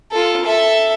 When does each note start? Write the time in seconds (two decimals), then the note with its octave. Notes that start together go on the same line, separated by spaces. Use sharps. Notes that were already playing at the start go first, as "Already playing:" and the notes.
0.12 F4 A4
0.45 A4 E5